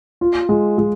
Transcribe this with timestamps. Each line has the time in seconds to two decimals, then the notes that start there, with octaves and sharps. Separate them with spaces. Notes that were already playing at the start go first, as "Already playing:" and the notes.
0.21 F4
0.49 G#3
0.78 G#3